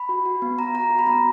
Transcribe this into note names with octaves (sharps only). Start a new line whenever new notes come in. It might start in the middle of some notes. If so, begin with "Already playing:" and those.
Already playing: B5
F#4
F#4
B3
F#4 A#5
F#4 A#5
F#4
B5
B3 A#5